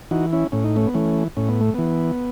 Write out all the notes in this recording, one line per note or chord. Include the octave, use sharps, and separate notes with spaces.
E3 D#4 F#4
C#4 E4
A2 C#4
D#4
A3 C#4
B3
E3 A3 C#4
A2 C#4
B3
A3
E3 B3